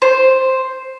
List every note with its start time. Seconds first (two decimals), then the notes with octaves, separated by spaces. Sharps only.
0.02 C5